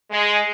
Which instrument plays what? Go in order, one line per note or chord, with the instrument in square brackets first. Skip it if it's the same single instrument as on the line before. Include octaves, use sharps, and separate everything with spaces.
[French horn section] G#3